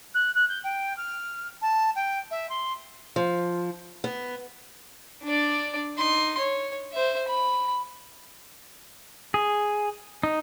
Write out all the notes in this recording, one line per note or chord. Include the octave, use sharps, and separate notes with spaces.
F#6
F#6
G6
G5
F6
A5
G5
E5
C6
F3
B3
D4 D5
D#4 C6
C#5
C5 E5
B5
G#4
D#4